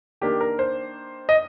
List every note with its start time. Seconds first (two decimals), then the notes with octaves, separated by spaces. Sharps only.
0.21 D#3 A#3 D4 G4
0.41 A#4
0.59 C5
1.29 D#5